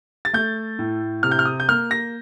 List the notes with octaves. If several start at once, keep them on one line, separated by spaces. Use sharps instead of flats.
A6
A3 G6
A2
C3 F6
G6
F6
D#6
G6
A#3 F6
A#6